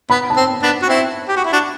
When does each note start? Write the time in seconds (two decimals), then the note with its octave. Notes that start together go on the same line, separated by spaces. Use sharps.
0.10 B3 B5
0.30 A5
0.36 C4
0.62 B3 D4
0.82 F#4
0.88 C4 E4
1.28 G4
1.36 F#4
1.45 E4
1.53 D4 F#4